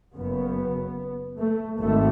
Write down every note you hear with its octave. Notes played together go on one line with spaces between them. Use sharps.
F#1 F#2 C#3 B3
A3
G#1 A3